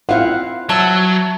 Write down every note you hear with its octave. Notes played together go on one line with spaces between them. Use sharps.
C4 E4 F4 F5 F#5
F#3 E5 A5